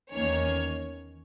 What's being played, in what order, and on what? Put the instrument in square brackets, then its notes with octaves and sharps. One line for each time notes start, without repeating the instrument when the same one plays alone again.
[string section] E2 D#3 A#3 C#4 C#5